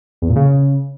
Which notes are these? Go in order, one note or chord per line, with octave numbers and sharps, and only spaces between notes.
E2
A#2
C#3